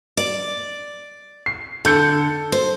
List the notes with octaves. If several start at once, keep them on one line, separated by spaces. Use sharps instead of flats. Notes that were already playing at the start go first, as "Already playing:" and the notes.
D5
C7
D3 A4 G6 C#7
C5